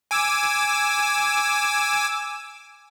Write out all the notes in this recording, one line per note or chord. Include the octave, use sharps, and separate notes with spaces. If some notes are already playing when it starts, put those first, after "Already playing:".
G#5 D6 E6